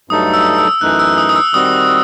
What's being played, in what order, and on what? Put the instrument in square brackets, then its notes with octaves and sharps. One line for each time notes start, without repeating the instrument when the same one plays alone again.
[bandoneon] G2 F#3 A3 D#4 A4 [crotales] D#6
[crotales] E6
E6
[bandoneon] F#2 E3 A3 D#4 [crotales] F#6
[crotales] E6
D#6
D#6
E6
[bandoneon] D#3 G3 C4 F#4 [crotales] D#6